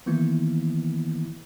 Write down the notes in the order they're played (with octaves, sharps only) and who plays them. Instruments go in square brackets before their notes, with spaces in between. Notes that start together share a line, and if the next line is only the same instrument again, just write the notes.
[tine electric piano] D#3 E3 A#3 B3 E4